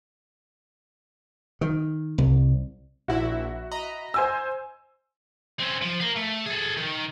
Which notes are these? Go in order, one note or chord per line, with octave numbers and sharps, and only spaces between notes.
D#3
C2
A#1 E4 F#4 E5
D#5 A#5 B5
C5 G#5 E6
C4 C#4
F3
A#4 F5
A3
G#4 A4
D#3